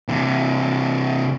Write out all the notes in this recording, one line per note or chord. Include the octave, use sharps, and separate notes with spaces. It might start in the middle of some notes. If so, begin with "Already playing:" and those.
C3 E3